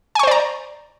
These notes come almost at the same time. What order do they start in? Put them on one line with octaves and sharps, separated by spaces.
G#5 C#6 C5 D5 A#5